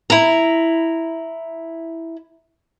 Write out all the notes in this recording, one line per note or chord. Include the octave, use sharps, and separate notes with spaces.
E4 A#5